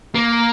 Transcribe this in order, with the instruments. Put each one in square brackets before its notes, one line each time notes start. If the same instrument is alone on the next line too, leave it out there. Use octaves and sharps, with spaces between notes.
[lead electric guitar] A#3